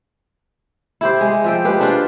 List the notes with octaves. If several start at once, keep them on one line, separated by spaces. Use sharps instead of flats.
E4 G4 C5
G#3
F3 E5 G5
G#3 G4 B4
D4 F4